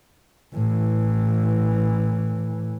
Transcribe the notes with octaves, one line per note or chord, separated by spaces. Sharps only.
A2 E3